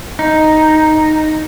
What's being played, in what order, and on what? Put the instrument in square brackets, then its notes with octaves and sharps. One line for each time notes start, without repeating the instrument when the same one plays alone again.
[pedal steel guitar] D#4